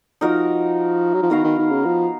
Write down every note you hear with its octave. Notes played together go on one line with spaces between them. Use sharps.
F3 D#4 F#4 A#4 D#5
F#3
F3
D#3 B3 F#4 A#4 F5
D#3
D#3
C#3
F3